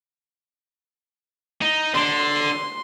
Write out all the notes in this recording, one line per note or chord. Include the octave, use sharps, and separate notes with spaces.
D#4
D3 C6